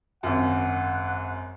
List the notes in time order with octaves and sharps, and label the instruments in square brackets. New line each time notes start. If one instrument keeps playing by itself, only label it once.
[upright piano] G#1 F#2 [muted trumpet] F#5